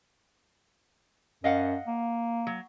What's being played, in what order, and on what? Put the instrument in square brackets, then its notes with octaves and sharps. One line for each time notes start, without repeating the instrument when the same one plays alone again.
[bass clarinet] F#2 [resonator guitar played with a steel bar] D#5 F5 F#5
[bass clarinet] A#3
[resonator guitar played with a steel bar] F#3